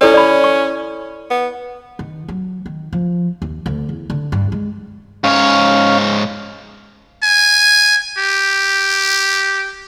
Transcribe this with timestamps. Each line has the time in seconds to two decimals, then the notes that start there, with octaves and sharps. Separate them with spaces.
0.01 C#4 E4 A4 D5
0.14 D5 B5
0.44 C#6
1.31 B3
1.99 D#3
2.28 F#3
2.66 D#3
2.93 F3
3.42 D#2
3.66 D2
3.89 E2
4.10 D3
4.32 G2
4.52 G#3
5.24 G#2 C#4 C#5 F5
7.23 G#5
8.18 G4